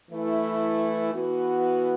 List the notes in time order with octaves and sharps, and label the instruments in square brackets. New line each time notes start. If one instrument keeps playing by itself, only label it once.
[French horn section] E3 A3 E4
E3 B3 F#4